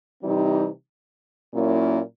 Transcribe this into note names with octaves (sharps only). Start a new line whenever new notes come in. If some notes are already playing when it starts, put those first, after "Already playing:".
C3 E3 G3 C4 D#4
A#2 F#3 A#3 C#4 E4